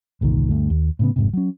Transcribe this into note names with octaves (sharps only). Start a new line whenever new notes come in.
G1 C2 A#2 D#3
D2 G2 A3
D#2
A2 C#3 B3
F1 G#2 C3
F#3 C#4